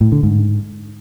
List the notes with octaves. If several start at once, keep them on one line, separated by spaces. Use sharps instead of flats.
A2
D3
G#2